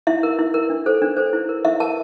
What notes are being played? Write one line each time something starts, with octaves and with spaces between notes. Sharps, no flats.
E4 E5
A#4
E4
A#4
D4
A4 C5
D4
A4 C5
E4
A#4
E4 E5
A#4 A5